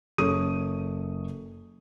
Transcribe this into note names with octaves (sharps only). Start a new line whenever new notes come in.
F#1 C#4 A4 C#6 D#6 D#7